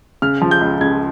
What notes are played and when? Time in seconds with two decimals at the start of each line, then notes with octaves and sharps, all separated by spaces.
0.22 C#3 F6
0.41 F3
0.51 G6
0.61 C#2
0.81 C#2 G#6